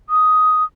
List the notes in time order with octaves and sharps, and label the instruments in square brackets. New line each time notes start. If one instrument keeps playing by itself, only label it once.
[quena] D#6